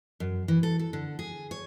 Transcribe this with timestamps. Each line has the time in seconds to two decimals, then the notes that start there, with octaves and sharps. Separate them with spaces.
0.20 F#2
0.48 E3
0.63 A4
0.79 A4
0.93 D3
1.19 G#4
1.51 C#5